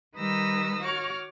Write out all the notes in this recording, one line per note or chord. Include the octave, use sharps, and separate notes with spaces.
D#3 G3 B4 D#6 E6 A#6
F#4 C#5 D6 F6